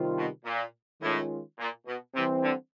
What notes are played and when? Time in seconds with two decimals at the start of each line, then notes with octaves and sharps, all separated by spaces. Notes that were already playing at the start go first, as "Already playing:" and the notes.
Already playing: C3 D#3 G3 C4 F4
0.17 B2
0.45 A#2
1.01 A2 D#3 G#3 C#4 F4
1.59 A#2
1.86 B2
2.15 C3 E3 G3 C4
2.43 D3